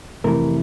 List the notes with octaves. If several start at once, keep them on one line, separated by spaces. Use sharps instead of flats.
F2 C3 E3 A3 A#4